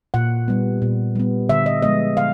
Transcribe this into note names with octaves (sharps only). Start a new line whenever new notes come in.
A#2 F#5
G3 B3
A#2
G3 B3
D3 E5
D#5
F3 G#3 B3 D#5
D3 F5